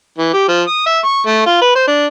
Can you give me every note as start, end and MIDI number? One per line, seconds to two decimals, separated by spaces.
0.18 0.32 52
0.33 0.47 67
0.48 0.62 53
0.67 0.85 87
0.86 0.99 76
1.05 1.21 85
1.26 1.43 57
1.46 1.58 65
1.62 1.74 71
1.75 1.86 72
1.88 2.06 62